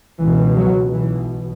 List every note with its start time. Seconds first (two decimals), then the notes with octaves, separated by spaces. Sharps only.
0.21 C#2 B2 E3
0.57 F#3
0.92 B1 B2 E3